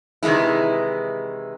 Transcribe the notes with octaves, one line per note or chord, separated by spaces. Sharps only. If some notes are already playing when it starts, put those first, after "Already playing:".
C3 D#3 E3 G#3 E4